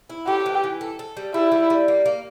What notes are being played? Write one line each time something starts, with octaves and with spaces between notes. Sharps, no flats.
E4
A3 G4
E3
E3
A4
A4
G3
G3 E4
G3
G3
A#3
A#3